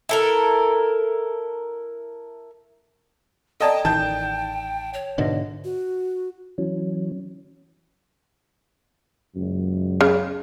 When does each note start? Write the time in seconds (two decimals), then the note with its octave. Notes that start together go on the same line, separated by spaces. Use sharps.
0.09 E4 A4 A#4
3.61 A4 D5 D#5 G5 A5 A#5
3.85 A1 D#3 A5 G6
4.94 C#5
5.18 G#2 B2 D3 D#5 E5
5.64 F#4
6.58 E3 F#3 C#4
9.36 F#1 C#2 F#2
10.01 C#3